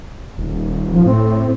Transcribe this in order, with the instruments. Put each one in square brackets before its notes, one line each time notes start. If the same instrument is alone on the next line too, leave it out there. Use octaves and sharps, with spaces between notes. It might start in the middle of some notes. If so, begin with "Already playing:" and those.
[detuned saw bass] D#1
[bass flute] F3
[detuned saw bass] A2 [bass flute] C4